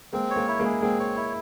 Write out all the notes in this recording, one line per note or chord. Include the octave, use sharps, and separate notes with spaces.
G#3 A#3 C4
C#5
G#3 A#3
E4
G#3 A#3
G#4
G#3 A#3 C4
C#5
E4